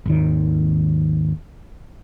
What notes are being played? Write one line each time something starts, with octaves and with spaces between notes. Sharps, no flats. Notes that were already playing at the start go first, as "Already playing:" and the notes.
G#1 D#2 D#3